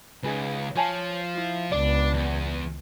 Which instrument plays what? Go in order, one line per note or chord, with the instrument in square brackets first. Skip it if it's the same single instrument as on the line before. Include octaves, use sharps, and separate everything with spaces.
[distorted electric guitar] C#2 [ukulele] D#4 G#4 B4
[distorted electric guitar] F3 [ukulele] C#5 G#5 A5
[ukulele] E4 F4
[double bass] C#2 B3 [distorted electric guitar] D4 [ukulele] D5
[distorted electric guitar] E2